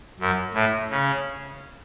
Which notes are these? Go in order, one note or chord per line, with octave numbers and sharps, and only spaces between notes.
F#2
A2
C#3